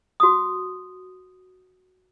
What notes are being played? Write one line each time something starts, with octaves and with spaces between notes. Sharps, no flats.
F#4 D#6